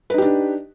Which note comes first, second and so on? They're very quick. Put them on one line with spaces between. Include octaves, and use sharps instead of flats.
B4 D#4 G4 D4